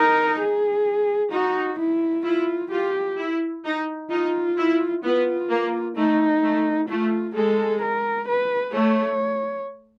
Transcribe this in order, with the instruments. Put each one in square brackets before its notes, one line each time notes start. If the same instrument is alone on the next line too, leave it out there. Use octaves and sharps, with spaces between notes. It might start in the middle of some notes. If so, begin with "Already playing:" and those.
Already playing: [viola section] D#4 [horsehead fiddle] A#4
[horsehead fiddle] G#4
[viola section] D#4 [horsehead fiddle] F#4
[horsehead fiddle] E4
[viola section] E4 [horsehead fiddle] F4
[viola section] F4 [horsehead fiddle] G4
[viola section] E4
D#4
[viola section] D#4 [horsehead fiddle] F4
[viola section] E4
[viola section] B3 [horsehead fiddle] F4
[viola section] A#3
[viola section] A3 [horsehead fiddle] D#4
[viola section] A3
[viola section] A3 [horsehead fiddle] F4
[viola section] G#3 [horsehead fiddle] A4
[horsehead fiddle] A#4
B4
[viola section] A3 [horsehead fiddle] C#5